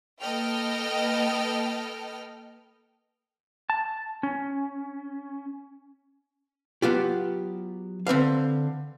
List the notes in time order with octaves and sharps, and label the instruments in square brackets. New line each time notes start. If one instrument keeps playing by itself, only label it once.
[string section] A#3 A4 B4 D#5 G5 F6
[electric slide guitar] A5
C#4
[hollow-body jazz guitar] F#3 B3 F4 G4
D3 C4 B4 F5